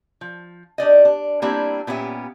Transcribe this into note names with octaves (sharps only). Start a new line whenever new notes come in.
F3
D4 G4 D5 D#5
D4
G3 A#3 C4 D4 E4 F4
A#2 B3 C#4 G4 E5